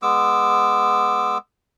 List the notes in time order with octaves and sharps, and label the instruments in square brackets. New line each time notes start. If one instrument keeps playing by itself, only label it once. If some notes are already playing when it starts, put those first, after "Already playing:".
[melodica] G#3 B3 D6 E6